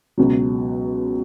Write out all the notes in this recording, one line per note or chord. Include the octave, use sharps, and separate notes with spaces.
C#2 B2 F#3